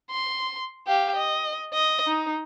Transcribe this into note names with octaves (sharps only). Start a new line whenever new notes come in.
C6
G4 F5
D#5
D#5
D#4